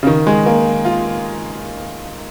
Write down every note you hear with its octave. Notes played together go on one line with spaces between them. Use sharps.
C#3
D#3
G#3
A#3
F4